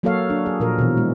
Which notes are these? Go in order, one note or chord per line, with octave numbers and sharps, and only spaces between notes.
F#3 A#3 F#4 A4 C#5 F5
D4
G#4
A#2 F3 A#4
B2 E3
G#3